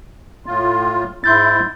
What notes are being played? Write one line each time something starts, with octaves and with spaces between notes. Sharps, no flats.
A2 F4
G#2 E4 C6 G6 A6